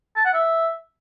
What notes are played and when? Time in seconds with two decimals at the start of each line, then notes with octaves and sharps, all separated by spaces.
0.16 A5
0.25 F#5
0.34 E5